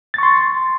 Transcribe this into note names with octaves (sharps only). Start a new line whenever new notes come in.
C6 C#6 A6